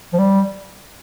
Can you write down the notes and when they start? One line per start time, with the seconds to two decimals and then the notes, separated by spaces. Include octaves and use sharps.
0.13 F3
0.19 G3